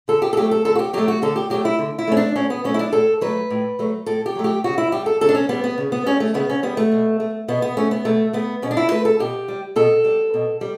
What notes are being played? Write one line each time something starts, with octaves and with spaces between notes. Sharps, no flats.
D3 A4
G4
A4
F#3 A3 G4
A4
D3 A4
F#4
G4
F#3 A3 G4
F#4
D3 A4
G4
F#3 A3 G4
E4
D3
E4
F#3 A3 C#4
D4
A2 C#4
B3
F#3 A3 C#4
E4
D4
A2 A4
F#3 A3 B4
A2
F#3 A3
A2 A4
G4
F#3 A3
G4
C#3 F#4
E4
G3 G4
A4
C#3 A4
D4
C#4
G3 B3
B3
C#3
B3
G3 C#4
A3
C#3 B3
C#4
G3 B3
A3
B2
A3
B2 B3
B3
A3 C#4
B3
B2 A3
A3 B3
B2 C#4
D4
E4
A3 B4
A4
B2 G4
G3
B2 A4
G3
B2
G3